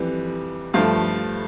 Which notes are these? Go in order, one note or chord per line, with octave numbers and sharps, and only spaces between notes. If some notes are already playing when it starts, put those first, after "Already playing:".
Already playing: F2 E3 G3
G2 F3 A3 F5